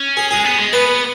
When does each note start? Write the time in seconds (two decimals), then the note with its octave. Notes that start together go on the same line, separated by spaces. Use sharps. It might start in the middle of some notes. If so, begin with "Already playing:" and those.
Already playing: C#4
0.17 G#4
0.31 G#3 G#4
0.45 B3
0.59 G#3
0.73 B3 B4